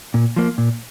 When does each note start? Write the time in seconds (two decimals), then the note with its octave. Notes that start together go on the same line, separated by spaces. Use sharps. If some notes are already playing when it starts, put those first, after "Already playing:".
0.14 A#2
0.36 F3 A#3
0.58 A#2